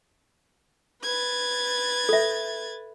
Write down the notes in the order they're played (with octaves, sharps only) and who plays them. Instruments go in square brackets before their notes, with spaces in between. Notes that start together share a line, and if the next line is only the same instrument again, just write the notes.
[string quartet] B4 G#6 A6
[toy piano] A4 E5